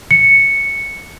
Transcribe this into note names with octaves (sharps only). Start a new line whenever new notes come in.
C#7